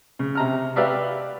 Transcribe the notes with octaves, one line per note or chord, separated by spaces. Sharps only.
C#3
C3 A#5 F6
F#4 G4 B4 D5 E5 F5